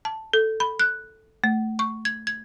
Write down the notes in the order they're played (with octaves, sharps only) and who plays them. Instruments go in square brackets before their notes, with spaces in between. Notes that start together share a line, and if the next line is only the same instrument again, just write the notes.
[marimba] A5
A4
B5
F#6
A3
C#6
G#6
G#6